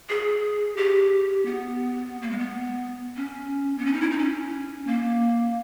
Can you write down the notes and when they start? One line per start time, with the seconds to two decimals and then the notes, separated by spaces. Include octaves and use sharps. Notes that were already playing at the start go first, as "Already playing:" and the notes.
0.09 G#4
0.76 G4
1.45 B3
2.22 A#3
2.31 G#3
2.39 B3
3.16 C#4
3.78 B3
3.86 C#4
3.93 D#4
4.01 E4
4.11 D#4
4.19 C#4
4.87 A#3